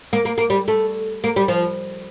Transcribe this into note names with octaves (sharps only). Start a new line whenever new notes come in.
A#3
A#3
A#3
G3
A3
A#3
G3
F3